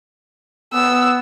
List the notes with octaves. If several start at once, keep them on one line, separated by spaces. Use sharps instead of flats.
B3 E6